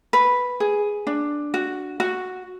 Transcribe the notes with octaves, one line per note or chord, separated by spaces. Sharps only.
B4
G#4
D4
F#4
F#4